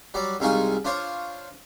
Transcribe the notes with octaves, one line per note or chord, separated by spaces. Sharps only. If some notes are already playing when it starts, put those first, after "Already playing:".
F#3 G3 D5
C2 G#3 D#4 F4 G#5 C#6
D4 F4 C5 C#5